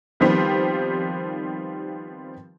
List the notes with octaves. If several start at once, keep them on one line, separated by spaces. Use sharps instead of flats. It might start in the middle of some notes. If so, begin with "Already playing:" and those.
D#3 F3 G3 B3 C4 G4